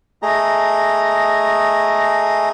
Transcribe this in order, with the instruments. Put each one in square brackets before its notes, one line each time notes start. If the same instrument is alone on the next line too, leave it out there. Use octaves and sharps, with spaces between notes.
[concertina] A3 G#4 D#5 A#5